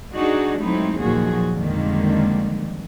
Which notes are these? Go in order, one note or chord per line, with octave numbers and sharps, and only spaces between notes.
D4 D#4 F#4 G#4
F#3 G#3 A3 C4 D#4 E4
D#2 A#2 F3 F#3 F#4 G#4
F2 D3 D#3 G3 G#3 A#3